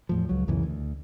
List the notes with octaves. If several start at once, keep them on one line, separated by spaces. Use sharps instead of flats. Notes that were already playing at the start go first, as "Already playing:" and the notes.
E2 A2 F3
C#2 F#3
C#2 F#2 B2 E3
D2